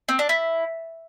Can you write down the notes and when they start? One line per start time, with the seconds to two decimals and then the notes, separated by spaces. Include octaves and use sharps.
0.09 C4
0.19 D4
0.29 E4